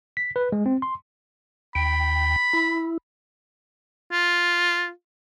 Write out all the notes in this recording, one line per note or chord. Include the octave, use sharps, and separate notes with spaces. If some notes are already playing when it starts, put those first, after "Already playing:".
B6
B4
G#3
C4
C6
D#2 G5 B5
E4
F4